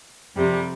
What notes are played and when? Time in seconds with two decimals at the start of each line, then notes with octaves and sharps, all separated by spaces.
0.35 F2 C3 G3 C4